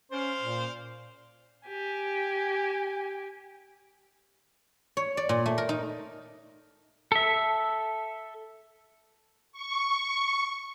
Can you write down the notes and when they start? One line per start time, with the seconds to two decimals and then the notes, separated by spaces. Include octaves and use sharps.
0.12 C#4 C5 D5 F5
0.41 A#2
1.68 G4 G#5
4.97 C#5
5.17 D5
5.29 A#2
5.46 A3
5.58 A#4
5.69 D#4
7.12 A4 E5
9.52 C#6